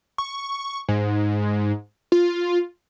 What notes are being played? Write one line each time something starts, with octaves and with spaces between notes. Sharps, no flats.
C#6
G#2
F4